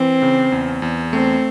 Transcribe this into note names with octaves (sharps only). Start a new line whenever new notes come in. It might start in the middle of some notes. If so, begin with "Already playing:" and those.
Already playing: E3 C4
C#3
E2
E2
A3 C4